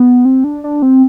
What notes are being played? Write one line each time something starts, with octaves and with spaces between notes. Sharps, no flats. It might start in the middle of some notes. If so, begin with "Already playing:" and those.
Already playing: B3
C4
D4
D4
C4